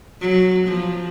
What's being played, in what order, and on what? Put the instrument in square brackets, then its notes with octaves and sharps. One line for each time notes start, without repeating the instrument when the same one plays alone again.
[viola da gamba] F#3
F3